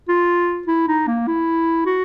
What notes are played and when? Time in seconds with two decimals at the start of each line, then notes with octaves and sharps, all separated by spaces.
0.08 F4
0.67 E4
0.88 D#4
1.07 A#3
1.27 E4
1.86 F#4